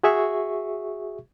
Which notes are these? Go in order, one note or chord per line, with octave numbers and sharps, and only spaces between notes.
F#4 G#4 E5 C#6